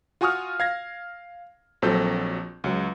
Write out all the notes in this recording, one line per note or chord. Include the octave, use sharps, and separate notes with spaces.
F4 F#4 G#5 C#6 D#6 F6
F5 G#6 A#6
A#1 F3 F#3 C4 A4 G6
C#2 F#3